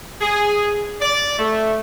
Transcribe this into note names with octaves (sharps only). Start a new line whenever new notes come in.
G#4
D5
A3